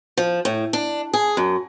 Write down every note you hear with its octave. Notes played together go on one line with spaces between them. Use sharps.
F3
A2
D4
G#4
F#2